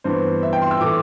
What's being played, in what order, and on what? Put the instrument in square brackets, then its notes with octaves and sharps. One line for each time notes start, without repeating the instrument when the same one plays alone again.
[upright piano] G2 E3 B3 C5
E5
G5
C6
E6
A2 E3 A3 D6